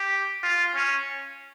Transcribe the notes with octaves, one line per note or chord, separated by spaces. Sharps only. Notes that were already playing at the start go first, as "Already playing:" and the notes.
Already playing: G4
F4
C#4